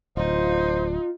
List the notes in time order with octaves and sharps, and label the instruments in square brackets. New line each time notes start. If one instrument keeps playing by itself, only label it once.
[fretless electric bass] D1 [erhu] D#4 [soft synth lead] F4 [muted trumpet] C5